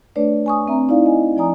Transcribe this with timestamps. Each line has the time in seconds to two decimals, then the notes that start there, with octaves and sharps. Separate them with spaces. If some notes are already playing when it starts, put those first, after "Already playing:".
0.16 A3 D4 B4 C#5 D5
0.46 G#5 C#6 D#6
0.68 C4 E5 A#5
0.89 D#4 E4 D5 F5
1.04 D#5 G#5
1.37 F3 D#4 D5 G#5 A#5 D#6